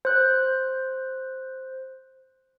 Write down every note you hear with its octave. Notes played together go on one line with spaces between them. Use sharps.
C5 F#6 G6